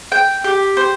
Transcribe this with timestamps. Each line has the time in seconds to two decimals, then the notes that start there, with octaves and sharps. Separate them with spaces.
0.12 G5
0.44 G4
0.77 C5